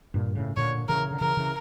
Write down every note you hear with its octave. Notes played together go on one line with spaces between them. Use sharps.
G2 A#2
A2 C#3
A#2 D3 C#5
C#3 E3 A#4
D3
C#3 E3 A#4
C#3 E3